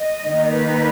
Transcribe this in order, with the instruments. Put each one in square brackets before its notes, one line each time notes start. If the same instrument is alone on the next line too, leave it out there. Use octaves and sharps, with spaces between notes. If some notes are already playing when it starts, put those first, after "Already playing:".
Already playing: [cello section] D#5
D#2 D#3 A#3 D#4
B4